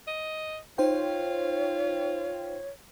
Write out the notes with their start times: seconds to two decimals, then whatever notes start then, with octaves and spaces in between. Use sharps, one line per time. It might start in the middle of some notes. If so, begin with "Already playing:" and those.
0.07 D#5
0.78 D#4 F4 C5 C#5 G5